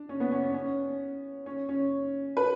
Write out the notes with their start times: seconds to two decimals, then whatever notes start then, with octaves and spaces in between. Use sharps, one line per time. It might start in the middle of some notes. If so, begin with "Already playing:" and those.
Already playing: D4
0.09 C#4
0.20 B3
0.32 C#4
0.43 C#4
0.54 C#4
1.46 C#4
1.69 C#4
2.37 B4